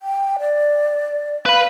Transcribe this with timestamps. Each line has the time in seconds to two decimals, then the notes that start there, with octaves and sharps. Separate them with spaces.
0.01 G5
0.39 D5
1.46 B4 F5 B5